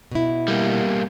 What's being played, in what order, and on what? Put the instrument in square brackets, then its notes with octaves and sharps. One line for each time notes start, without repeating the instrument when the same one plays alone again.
[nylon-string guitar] B2 E4
[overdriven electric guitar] G3 A#3